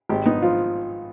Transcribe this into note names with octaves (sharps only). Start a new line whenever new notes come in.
G#1 G4
B3 D#4
F3 F4